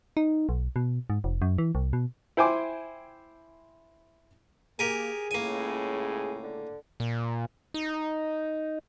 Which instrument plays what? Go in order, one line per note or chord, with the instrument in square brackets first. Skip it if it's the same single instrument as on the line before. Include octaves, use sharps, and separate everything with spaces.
[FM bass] D#4
B1
B2
G#2
F1
F#2
E3
C2
B2
[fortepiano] E4 C5 G5 G#5 C6 D6
[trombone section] A#3 [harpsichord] G4 A#4 G#5 [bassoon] G#4
[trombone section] C#2 A2 C#3 [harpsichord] A#3 G#5
[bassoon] D3
[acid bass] A#2
D#4